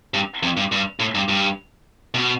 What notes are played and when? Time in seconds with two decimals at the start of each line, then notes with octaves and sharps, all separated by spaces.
0.14 G2
0.43 F2
0.57 G2
0.72 G2
1.00 A2
1.15 G2
1.29 G2
2.14 B2